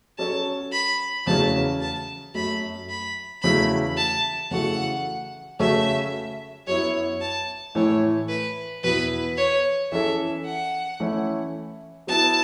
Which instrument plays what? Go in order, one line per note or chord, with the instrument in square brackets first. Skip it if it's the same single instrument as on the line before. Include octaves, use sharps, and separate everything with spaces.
[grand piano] F#3 C#4 A4 C#5 [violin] A5
[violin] B5
[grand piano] E2 C#3 F#3 A3 C#4 [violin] A5
[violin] A5
[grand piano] F#2 F#3 A3 [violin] B5
[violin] B5
[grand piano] E2 C#3 F#3 A3 E4 [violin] B5
[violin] A5
[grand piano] C#3 E3 A3 F#4 A4 [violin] F#5
[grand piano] C#3 A3 C#4 F#4 A4 [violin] E5
[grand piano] F#2 F#3 B3 E4 [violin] C#5
[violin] A5
[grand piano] A2 E3 A3 E4 [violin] C#5
[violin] B4
[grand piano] E2 B2 B3 E4 [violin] B4
[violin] C#5
[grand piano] E3 C#4 A4 [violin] E5
[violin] F#5
[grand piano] E3 A3 C#4 E4
[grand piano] F#3 B3 E4 [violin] A5